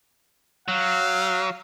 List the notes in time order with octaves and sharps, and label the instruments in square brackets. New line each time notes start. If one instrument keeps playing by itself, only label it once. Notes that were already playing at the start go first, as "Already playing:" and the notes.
[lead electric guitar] F#3 [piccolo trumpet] F5